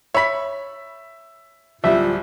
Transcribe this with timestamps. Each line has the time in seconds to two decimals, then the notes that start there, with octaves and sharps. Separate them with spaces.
0.14 C#5 E5 B5 B6
1.84 D1 G3 F4 E5